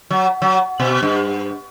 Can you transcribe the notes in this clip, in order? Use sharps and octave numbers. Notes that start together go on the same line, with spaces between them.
F#3
F#3
B2
G2